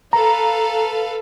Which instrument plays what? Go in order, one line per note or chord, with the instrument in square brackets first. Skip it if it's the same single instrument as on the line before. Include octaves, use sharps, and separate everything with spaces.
[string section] A4 B4 F5 [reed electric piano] A#5